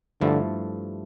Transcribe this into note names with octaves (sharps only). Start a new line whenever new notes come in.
G2 D3 F3 A3 E4 A4